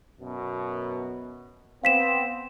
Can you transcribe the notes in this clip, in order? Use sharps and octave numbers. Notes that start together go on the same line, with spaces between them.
F#2 B2
B3 C4 F5 B6 E7